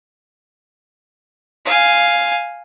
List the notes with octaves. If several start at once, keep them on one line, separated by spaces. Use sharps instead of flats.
F5 G#5